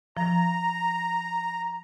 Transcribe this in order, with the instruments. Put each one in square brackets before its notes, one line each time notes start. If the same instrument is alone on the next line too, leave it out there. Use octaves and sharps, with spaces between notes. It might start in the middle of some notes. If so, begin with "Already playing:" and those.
[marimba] F3 [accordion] A#5